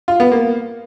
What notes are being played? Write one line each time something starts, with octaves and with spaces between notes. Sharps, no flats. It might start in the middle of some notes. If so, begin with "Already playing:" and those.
F4
B3
A#3